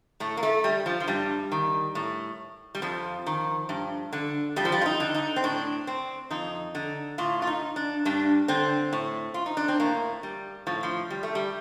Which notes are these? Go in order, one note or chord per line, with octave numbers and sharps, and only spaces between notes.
A2 A3
A#3
A3
G3
F3
F3
G2 G3
D#3
A2
G3
F2 F3
D#3
G2
D3
F2 G3
F3
G3
F4
D#4
D3
D#4
C4
A2 D4
C4
F2 D#4
D3
A2 F4
F4
D#4
D4
G2 D4
D3 C4
A2
F4
D#4
D4
C4
A2 A#3
G3
A2 F3
F3
G3
A3
G3